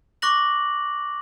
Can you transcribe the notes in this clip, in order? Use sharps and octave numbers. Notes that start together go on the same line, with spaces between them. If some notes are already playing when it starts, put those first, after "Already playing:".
C#6 D6 F#6 A#6 F#7